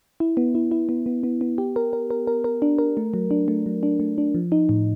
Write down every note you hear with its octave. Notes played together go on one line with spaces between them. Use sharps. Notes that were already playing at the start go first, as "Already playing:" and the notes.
E4
B3
E4
E4
B3
B3
B3
B3
G4
A#4
A#4
A#4
A#4
A#4
D4
A#4
A3
F#3
D4
A3
F#3
D4
A3
D4
F3
D#4
A2